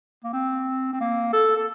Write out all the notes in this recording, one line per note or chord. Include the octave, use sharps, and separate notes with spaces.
A#3
C4
C4
A#3
A4
A4